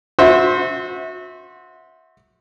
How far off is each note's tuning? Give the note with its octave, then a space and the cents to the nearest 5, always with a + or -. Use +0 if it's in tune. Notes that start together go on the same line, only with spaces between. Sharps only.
F#4 -30 C5 +0 E5 -20